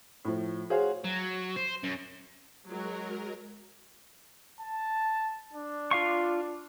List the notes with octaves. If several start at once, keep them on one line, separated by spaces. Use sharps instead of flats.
A2 F3
F#4 G#4 C5 C#5 F5
F#3
C5
F#2
F#3 G#3 A#4
A5
D4
F4 F5 C#6